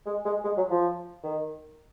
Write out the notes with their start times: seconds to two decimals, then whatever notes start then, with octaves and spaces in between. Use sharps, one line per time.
0.06 G#3
0.25 G#3
0.44 G#3
0.57 F#3
0.70 F3
1.24 D#3